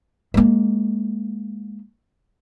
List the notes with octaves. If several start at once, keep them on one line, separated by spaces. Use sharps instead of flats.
G#3 A#3